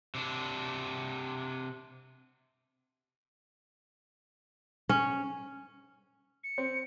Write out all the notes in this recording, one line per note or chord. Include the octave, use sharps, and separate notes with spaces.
C3 D4
C#4
C#7
C4